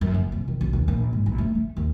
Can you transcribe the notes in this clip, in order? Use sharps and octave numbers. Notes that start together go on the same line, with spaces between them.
F#2
F#1
C3
D#3
B1
D#2
A#1
G#2
B1
A3
A3
D#2